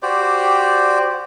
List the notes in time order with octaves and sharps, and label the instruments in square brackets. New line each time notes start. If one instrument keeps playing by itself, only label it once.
[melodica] F#4 G4 C5 D5